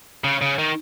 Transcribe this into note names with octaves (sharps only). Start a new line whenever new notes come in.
C#3
C#3
D#3